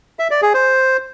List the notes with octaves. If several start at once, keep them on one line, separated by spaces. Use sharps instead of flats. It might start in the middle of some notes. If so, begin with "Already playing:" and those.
E5
D5
G#4
C5